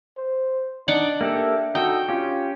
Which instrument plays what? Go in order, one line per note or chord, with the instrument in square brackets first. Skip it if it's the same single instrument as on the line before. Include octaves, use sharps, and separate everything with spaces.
[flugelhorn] C5
[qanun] D4 D5 F#5 [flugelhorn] D#4
[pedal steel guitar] A#3 G4 A4 [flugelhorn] E5
[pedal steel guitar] D#4 A4 [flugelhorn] F#4 [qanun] G5
[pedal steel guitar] C#4 G4 [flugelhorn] F4